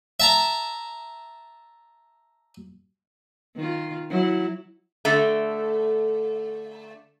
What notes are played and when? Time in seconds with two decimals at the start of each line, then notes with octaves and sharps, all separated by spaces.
0.20 E5 A5 A#5
3.56 D#3 F4
4.10 F#3 E4
5.05 D3 A3